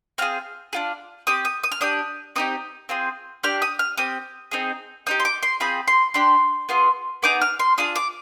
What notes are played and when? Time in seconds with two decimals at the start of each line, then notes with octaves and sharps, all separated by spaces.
0.18 C4 F4 G#4 F6
0.73 D4 F4 G#4
1.27 C4 G4 D#6
1.45 D#6
1.63 D#6
1.72 F6
1.81 D4 G4 D#6
2.36 C4 D#4 G4 D#6
2.89 C4 F4 G#4
3.44 D4 G4 F6
3.62 D#6
3.79 F6
3.97 C4 G4 D#6
4.51 C4 D#4 G#4
5.07 C4 D#4 G4 D#6
5.20 C6
5.25 D6
5.43 C6
5.60 C4 F4 G#4 B5
5.88 C6
6.14 D4 G4 C6
6.69 B3 F4 G#4
7.23 B3 D#4 G#4 D6
7.42 F6
7.59 C6
7.78 D4 F4 G#4 D#6
7.96 D6